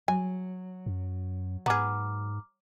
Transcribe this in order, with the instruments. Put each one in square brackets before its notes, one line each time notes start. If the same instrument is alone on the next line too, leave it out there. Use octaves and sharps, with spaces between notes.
[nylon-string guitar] F#3 [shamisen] G#5
[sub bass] F#2
[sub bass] G#2 [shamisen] B3 G#4 [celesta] A#5 D6 F6